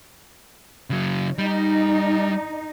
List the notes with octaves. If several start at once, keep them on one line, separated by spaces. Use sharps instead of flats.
C#3 F#3
G3 D#4